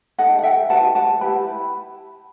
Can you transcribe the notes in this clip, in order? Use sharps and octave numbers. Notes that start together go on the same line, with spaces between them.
D#4 A4 D#5 F#5
F#5
E5 G5
D#4 F#4 B4 F#5 A5
F#5 A5
E4 G4 B4 G5 B5